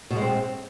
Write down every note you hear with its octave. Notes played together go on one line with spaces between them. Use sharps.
B2
G#3
C4